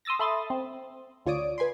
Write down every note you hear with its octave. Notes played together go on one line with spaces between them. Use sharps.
C6 D#6 E6 A6 A#6
A4 E5 B5 C6 D#6 A6
C4
D2 F4 C#5 D5 D#6 D7
B4 G#5 B5 C6